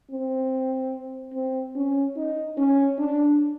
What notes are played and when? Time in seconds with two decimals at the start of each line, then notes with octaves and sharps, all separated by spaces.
0.11 C4
1.33 C4
1.76 C#4
2.16 D#4
2.57 C#4
2.98 D4